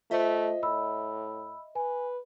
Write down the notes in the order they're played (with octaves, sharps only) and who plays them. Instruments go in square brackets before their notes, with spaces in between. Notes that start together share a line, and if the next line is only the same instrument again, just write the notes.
[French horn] A3 [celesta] F4 C5 [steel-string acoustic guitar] D#5 E5
[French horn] A2 [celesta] B5 E6
[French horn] B4 [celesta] G#5